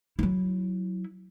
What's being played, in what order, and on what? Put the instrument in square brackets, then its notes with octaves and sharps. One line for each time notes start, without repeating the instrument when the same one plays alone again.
[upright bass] F#3 E4